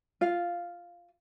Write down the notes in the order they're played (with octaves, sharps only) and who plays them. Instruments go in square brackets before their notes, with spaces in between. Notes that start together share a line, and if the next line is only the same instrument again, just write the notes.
[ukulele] F4 F5